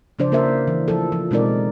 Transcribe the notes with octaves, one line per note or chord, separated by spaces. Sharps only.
C#3 F3 D4 C5 D5
A#3 A#4 C5 E5
E3
F3 A4
F3
B2 G#3 C4 D#4 A#4 D5